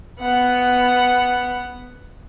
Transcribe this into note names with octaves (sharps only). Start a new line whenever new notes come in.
B3 F#5